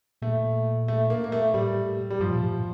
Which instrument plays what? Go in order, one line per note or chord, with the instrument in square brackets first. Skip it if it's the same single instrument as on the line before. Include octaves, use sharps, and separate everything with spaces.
[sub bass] A#2 [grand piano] A3
[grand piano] A3
A#3
A#3
A3
[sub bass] A2 [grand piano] G3
[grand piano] G3
[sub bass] G2 [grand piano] F3
[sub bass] A#2
A2